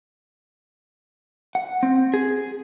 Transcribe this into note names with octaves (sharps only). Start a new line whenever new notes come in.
F#5
C4
G#4